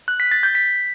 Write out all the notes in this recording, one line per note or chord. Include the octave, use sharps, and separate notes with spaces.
F#6
B6
A6
G6
B6